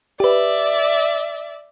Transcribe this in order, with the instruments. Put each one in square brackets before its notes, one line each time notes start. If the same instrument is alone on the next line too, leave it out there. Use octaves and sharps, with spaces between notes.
[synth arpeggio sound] G4 B4 [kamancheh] D5 E5